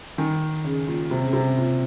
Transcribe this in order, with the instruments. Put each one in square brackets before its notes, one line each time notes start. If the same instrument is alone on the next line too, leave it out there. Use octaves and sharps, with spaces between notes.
[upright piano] D#3
C#3
A#2
C3
C#3
C3
A#2